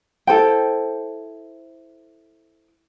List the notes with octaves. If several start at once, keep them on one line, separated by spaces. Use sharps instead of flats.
E4 A4 C5 G5